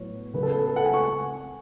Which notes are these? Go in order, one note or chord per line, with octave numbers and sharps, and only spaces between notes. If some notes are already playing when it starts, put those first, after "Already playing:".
Already playing: A2 F#3 B3 C#5
C#3 F#3 B3 B4
A4
B4
A4
F#5
G#5
C#6